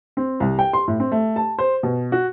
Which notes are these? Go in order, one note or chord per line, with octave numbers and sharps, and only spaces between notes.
C4
C2
G5
C6
A2
C4
A3
A5
C5
B2
F#4